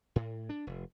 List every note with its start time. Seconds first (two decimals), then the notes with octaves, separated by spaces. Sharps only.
0.16 A2
0.49 D4
0.67 F1